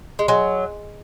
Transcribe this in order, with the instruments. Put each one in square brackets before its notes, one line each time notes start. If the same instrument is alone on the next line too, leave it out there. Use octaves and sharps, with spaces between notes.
[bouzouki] G#3
[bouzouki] F#3 [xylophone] G#4 D#5 G#5 C6